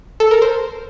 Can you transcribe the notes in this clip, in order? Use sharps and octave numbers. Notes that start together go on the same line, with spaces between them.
A4
A#4
C5